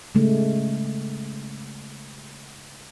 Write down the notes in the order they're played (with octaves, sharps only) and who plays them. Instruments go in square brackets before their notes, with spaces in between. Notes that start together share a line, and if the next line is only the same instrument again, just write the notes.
[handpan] C#3 G#3 A3